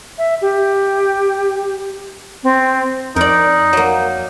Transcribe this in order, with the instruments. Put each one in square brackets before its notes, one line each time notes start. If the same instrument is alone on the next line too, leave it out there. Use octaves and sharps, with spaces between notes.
[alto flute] E5
G4
C4
[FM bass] F2 [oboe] D#4 [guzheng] A#4 D5
[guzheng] F#3 A#3